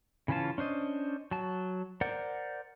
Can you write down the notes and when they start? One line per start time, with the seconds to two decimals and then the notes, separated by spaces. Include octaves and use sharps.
0.28 C#3 E3 C#4 F4 A5
0.58 C#4 D4 C5 D#5
1.31 F#3 A5
2.01 A#4 C5 D5 F#5